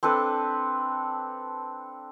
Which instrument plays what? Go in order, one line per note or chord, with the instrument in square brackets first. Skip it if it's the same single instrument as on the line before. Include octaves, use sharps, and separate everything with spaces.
[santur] C4 D4 A4 B4